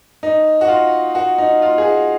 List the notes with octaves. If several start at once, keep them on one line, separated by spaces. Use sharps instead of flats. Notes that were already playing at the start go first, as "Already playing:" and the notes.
D#4
F#4
F4
F#4
D#4
F4
G#4
F#4